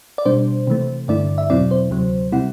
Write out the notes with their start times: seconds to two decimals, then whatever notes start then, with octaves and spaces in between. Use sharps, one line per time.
0.18 D5
0.26 B2 G3 D4 C5
0.67 C3 E3 A3
1.08 G2 D3 A3 E4 D5
1.38 E5
1.50 E2 B2 F#3 C4 E4 D5
1.71 C5
1.91 D2 C3 F#3
2.32 C3 G3 C4 E4 F#5